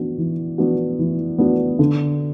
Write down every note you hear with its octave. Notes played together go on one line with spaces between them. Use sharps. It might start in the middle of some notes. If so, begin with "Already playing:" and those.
Already playing: E3 B3 D4 F#4
E3
B3 D4 F#4
E3
B3 D4 F#4
D3